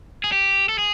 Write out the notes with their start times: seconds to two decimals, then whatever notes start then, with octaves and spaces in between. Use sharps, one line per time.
0.24 G#4
0.32 G4
0.69 A4
0.79 G#4